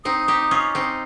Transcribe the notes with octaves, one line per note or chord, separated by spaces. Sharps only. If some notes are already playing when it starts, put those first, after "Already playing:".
C4 D#4 D#6
D#4 G4
C#4 F4
C4 D#4